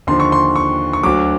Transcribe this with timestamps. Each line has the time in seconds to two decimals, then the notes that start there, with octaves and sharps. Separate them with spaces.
0.07 D#2 D3 F3 C6
0.20 C#6
0.32 C6
0.56 C#6
0.93 C#6
1.03 D2 D3 F#3 D6